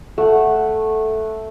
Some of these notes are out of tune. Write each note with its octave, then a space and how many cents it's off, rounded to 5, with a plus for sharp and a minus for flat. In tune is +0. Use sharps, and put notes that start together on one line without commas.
A3 -5 F#5 +0